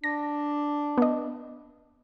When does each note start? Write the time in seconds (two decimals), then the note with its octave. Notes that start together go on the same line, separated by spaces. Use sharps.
0.04 D4 A#6
0.98 B3 D#5